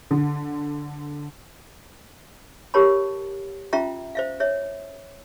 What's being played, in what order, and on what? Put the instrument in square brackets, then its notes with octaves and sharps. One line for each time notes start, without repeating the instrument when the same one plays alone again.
[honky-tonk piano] D3
[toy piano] G4 A#4 C#5 A5 B5
C#4 F4 E5 G5 A#5
C5 E5 F5
C#5 E5